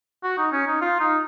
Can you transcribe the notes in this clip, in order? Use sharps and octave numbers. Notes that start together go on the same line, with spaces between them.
F#4
D#4
C#4
D#4
F4
D#4